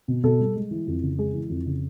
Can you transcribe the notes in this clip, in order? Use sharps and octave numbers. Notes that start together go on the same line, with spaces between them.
B2
B2 A4
G3
G#3
E3
F2
C#3
G#3 G#4
E3
F2
C#3